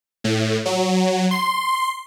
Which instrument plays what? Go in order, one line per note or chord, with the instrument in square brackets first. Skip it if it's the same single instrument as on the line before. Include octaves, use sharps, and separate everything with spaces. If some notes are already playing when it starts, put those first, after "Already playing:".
[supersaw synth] A2
F#3
C6